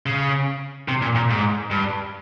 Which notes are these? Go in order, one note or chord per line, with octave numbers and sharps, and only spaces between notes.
C#3
C3
A#2
A#2
G#2
G2